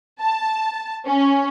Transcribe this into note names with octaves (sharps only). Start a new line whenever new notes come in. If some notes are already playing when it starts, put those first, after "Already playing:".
A5
C#4